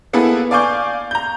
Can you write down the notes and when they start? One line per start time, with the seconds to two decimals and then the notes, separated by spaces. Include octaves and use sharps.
0.13 A#3 B3 E4 G#4 A4 B4
0.51 D5 F5 G#5 C#6 D6 G6
1.11 A#5 G6